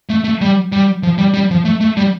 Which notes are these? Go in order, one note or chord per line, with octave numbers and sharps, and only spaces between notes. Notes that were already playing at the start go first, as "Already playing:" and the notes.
A3
A3
G3
G3
F3
G3
G3
F3
A3
A3
G3